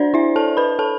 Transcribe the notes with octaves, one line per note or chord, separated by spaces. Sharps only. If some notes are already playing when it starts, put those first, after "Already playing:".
Already playing: D4 C5 D5
E4 E5
A4 A5
B4 B5
A4 A5